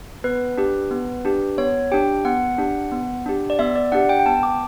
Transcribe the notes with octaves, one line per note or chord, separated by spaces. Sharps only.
B3 B4
D4 G4
B3
D4 G4
B3 C#5
D4 G4 G5
B3 F#5
D4 G4
B3
D4 G4
D5
B3 E5
D5
D4 G4 F#5
G5
G5
B3 A5
D6